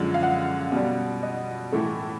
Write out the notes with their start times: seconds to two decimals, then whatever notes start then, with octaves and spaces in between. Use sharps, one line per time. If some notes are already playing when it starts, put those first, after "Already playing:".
Already playing: F#2 D3 F3 G#3
0.14 F5
0.23 F#5
0.72 B2 G3
1.23 D#5
1.72 A2 E3 A3